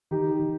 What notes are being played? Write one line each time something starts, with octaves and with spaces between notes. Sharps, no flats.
D#3 D#4 G4
D#3